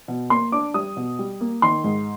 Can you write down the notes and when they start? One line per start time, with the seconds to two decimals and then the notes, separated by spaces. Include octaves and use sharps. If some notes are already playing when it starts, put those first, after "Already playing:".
0.08 B2
0.30 A#3 C6
0.52 D4 D6
0.74 G3 D#6
0.97 B2
1.19 G3
1.41 A#3
1.62 D#3 C6
1.84 G#2